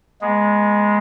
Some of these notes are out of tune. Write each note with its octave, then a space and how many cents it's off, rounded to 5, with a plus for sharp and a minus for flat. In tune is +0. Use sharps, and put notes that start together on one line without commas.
G#3 +0 B3 -40